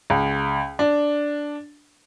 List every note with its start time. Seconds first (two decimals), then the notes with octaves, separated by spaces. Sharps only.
0.10 C#2
0.79 D4